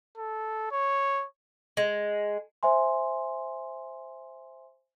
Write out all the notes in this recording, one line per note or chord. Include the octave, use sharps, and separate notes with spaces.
A4
C#5
G#3
C5 E5 G#5 C6